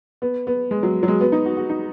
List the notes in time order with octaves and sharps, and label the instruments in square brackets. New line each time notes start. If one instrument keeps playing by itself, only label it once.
[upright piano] B3
B3
G#3
F#3
F#3
G#3
B3
D#4
F#4
F#4
D#4